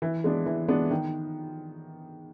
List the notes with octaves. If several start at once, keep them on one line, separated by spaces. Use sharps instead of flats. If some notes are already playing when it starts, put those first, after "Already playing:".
E3
G#3 B3 D4
E3
G#3 B3 D4
D#3